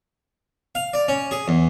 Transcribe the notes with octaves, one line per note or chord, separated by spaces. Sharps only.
F5
D5
C#4
G#4
E2